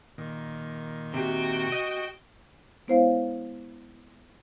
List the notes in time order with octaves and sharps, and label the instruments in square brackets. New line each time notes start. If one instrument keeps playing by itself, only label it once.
[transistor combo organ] A#2 D#3
[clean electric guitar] C3 [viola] F#4 G5
[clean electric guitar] D#5
[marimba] G#3 B3 E4 C5 C#5 F5